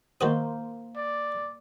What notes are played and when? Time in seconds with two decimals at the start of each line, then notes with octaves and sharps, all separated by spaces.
0.21 D#3 A#3 F#4 C5 D#6
0.96 D5